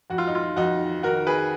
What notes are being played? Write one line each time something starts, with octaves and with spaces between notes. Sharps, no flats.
F2 F#4
F4
D#4
F4
F2 D#4 F#4
D#3 F#4 A#4
G#4 B4